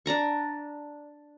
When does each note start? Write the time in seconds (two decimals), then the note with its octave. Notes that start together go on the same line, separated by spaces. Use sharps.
0.06 D4 D5 A#5 C#6